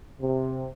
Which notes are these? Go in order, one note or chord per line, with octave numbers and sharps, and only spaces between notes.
C3